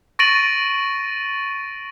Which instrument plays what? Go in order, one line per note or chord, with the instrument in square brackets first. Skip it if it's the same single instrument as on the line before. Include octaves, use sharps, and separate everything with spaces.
[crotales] C#6 A6 A#6 D7 D#7 F#7